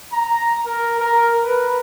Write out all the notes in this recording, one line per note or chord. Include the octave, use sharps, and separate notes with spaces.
A#5
A#4
A#4
B4